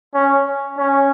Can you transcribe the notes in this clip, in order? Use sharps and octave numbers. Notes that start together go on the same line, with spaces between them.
C#4
C#4